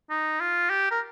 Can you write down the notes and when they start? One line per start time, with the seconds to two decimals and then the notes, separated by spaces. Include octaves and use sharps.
0.10 D#4
0.40 F4
0.70 G4
0.91 A#4